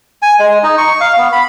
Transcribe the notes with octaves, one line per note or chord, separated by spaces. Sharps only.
G#5
G#3
D#4
C#6
F5
B3
B5